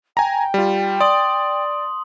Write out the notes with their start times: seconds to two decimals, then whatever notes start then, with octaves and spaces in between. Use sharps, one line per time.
0.17 G5 G#5 A#5
0.54 G3 F4
1.00 D5 C6 D#6 F#7